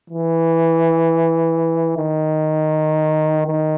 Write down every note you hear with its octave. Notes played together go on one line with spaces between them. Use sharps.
E3
D#3
D#3